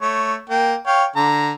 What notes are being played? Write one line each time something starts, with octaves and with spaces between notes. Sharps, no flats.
A3 C#5
A#3 G5
C#5 F5 G5
D3 A#5